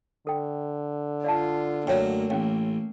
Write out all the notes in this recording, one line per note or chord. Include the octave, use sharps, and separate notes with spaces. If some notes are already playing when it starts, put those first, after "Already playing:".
D3 A4 G5
F4 D5 F5 A5
F#2 F#3 A3 A#3 C#5 F5 G5
A1 C#4 F5 G5